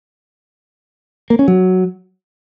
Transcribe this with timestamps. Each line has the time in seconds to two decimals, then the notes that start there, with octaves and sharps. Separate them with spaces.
1.30 A#3
1.39 C#4
1.48 F#3